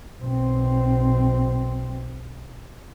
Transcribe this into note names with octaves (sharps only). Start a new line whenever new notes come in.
B1 C4